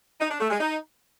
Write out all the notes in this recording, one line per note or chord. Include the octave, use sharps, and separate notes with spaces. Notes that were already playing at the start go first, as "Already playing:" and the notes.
D#4
D4
A3
G#3
D#4